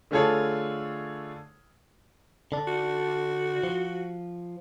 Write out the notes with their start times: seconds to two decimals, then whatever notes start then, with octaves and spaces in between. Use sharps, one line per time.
0.11 D3 A3 F4 G#4 A4 C#5
2.52 D3 D4
2.67 F#4
3.63 F3